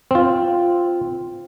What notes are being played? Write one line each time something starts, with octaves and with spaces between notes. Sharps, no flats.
C4 F4